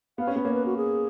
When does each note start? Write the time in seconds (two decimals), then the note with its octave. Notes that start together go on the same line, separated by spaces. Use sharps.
0.18 B3 F5
0.27 C#4
0.36 B3
0.42 A#3 C#5
0.54 B4
0.65 F#4
0.77 G#4